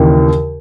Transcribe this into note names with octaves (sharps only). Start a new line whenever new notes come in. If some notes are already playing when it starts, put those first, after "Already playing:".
Already playing: D#2 C#3 E3